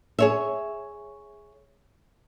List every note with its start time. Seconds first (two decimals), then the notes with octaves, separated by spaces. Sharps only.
0.19 G#4 C#5 E5